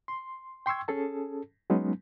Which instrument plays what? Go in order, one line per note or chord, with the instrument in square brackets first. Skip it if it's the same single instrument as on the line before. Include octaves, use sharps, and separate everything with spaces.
[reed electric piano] C6
G5 C6 C#6 E6 G#6
C#4 G#4 A4 A5
F#3 G#3 B3 C#4 D#4